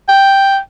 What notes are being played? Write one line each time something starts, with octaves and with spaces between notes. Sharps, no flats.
G5